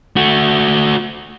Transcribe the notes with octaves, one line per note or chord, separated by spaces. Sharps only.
A3 F#4